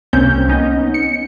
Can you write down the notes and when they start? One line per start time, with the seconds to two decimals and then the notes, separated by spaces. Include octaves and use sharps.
0.13 C2 A#3 C4 C#4 G6
0.49 B3 C#4 D#4 D#5
0.94 C#7